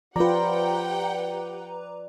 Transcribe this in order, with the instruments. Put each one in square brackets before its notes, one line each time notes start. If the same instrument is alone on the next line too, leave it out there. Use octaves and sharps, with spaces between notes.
[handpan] F3 F4 [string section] G4 F#5 G5 [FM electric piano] B4 A#5 [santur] D5